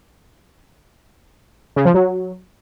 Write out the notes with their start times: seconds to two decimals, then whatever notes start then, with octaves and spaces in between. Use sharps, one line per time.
1.76 C#3
1.85 F3
1.94 F#3